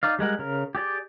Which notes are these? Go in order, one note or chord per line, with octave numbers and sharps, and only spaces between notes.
D#4 D5 F5
G3 G#3 A#4 F#5
C#3 A#4
G4 G#4 D5 G5